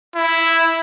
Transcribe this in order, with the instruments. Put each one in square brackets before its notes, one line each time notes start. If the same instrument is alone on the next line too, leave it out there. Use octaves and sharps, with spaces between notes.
[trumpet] E4